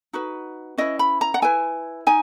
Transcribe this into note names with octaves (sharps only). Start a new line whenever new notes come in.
D#4 F#4 B4
C#4 E4 B4 D#5
B5
A#5
F#5
E4 B4 G#5
D#4 G#5